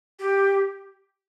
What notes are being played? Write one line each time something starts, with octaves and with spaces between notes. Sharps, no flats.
G4